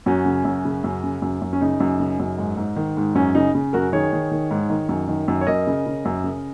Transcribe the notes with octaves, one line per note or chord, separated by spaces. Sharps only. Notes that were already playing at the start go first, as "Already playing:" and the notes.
F#2 C#4 F#4
C#3
F#2
C#3
F#2
C#3
F#2
F#2
C#4
C#3 D#4
F#2
C#3
F#2
G#2
G#2
D#3
G#2
F#2 C#4
C#3 D#4
C#3
F#2 F#4 A#4
D#3 G#4 C#5
D#3
D#3
G#2
D#3
F#2
D#3
F#2
C#5
F#2 A#4 D#5
C#3
C#3
F#2
C#3